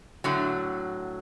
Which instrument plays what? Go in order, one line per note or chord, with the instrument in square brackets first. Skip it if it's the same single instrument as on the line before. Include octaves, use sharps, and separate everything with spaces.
[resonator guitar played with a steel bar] A2 D3 F#3